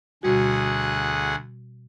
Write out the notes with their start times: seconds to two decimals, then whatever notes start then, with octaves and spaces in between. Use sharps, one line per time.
0.23 D2 B2 G3 F#4 G#4 F#5